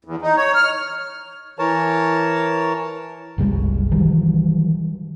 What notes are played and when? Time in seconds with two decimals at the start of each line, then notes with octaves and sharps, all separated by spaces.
0.05 E2
0.22 D#4
0.36 C#5
0.55 F6
1.59 E3 A#4 C#5 A5
3.38 F#1 C2 G3 G#3
3.92 D#3 E3 F#3 G3